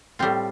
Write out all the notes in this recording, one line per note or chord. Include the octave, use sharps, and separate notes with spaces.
A2 G3 C4 F4